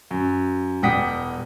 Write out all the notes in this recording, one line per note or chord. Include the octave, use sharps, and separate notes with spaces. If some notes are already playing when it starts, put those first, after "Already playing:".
F#2
E1 G3 F#5 G5 D#6 B6